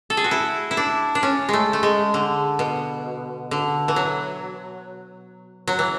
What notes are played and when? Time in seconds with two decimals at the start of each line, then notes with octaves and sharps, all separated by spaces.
0.10 A4
0.17 G#4
0.24 F#4
0.31 E4
0.71 E4
0.77 D4
1.15 D4
1.23 C#4
1.49 G#3 A3
1.73 A3
1.83 G#3
2.14 D3
2.59 B2
3.51 D3
3.88 E3
3.96 F#3
5.68 F#3
5.79 E3